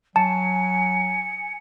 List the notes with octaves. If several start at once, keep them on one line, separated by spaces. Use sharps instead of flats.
F#3 G#5 A5 C#7